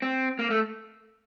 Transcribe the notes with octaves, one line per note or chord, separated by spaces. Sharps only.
C4
A#3
A3